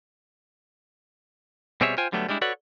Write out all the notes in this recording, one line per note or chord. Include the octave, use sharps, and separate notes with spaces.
B2 G3 C4 G#4 C#5 E5
F4 C5 G5 G#5
D3 F#3 G3 A3 B3
G3 G#3 D4 E4
F#4 A4 B4 C#5 D5 F#5